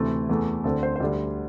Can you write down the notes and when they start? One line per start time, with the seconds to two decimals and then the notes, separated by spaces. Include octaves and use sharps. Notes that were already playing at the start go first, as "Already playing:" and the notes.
Already playing: D2 C3 E3 A3
0.29 E2 E3 A3
0.64 D2 D3 C4 A4
0.83 C5
0.96 C5
1.00 D2 D3 G3 D5